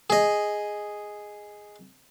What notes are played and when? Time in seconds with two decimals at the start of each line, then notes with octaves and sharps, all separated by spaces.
0.10 G#4 D#5